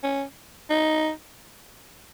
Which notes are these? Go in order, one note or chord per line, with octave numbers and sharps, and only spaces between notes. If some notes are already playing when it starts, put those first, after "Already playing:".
C#4
D#4